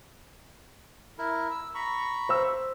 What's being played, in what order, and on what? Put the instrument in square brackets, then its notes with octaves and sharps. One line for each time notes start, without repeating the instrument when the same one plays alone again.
[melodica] E4 A#4
E6
A#5 B5 C#6
[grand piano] C5 E6